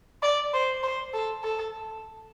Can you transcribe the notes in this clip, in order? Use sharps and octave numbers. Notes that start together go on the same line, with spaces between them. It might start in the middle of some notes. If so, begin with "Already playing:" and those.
D5
C5
C5
A4
A4